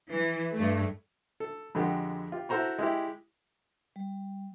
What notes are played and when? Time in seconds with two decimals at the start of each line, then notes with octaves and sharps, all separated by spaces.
0.11 E3
0.53 G2 A3
1.40 A4
1.75 F2 D3 G#3 G4 F#5
2.32 F4 G4
2.49 E4 F#4 A4 C5 A#5 C#6
2.79 G#3 E4 G4
3.96 G3